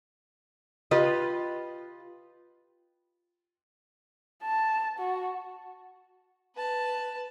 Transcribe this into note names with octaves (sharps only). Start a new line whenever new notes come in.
F4 G4 B4 D#5
A5
F#4
B4 A5